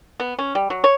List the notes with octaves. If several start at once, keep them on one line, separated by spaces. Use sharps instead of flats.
B3
C#4
G3
F#3
C#5